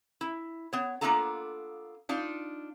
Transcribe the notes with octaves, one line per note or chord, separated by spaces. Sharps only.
E4
B3 C#5
A#3 B3 D4 F4 A4 A#5
D4 D#4 F4